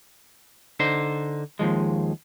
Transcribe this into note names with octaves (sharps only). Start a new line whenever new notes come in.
D3 D#4 C5
D#2 G#2 F3 G#3